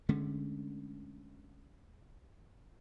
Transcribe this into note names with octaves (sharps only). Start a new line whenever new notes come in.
D3 G#3 A3 C#4